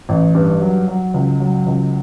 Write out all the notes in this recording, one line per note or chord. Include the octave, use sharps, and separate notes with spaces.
A1
G2
F#3
F#3
C#2
F#3
C#2